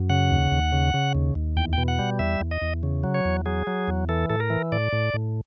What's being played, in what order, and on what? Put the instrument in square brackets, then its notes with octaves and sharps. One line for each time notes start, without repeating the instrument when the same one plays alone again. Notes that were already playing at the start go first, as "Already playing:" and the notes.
Already playing: [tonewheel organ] F#2
C#3 F#5
D#2
D#2
C#3
C#3
D#2
D#2
E2 G5
B2 G5
F#5
G3
E2 E5
E2
D#5
E2
C#3
F#3
C#5
E2
F#3 G#4
F#3
E2
E3 A4
A2 A4
A#4
E3
A2 D5
A2
A2